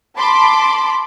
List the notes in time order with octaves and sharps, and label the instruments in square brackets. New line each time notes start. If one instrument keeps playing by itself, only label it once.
[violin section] A5 B5 C6 D6